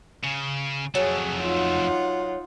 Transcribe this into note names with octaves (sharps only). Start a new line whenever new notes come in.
C#3
F2 F#3 A3 G#4
D#4 F4 F#5